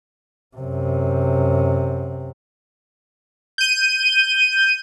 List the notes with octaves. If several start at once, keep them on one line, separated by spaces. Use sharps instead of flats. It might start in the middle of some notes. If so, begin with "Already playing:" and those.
F#2 C3
G6 D#7